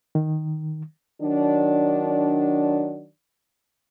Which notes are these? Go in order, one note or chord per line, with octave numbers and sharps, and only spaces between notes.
D#3
D#3 F#3 D4